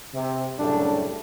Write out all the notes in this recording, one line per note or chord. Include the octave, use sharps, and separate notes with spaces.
C3
F#2 A2 C#3 G3 A3 D4